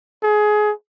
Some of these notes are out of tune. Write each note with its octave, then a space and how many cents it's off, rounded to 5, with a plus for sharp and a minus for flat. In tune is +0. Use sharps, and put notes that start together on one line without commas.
G#4 +20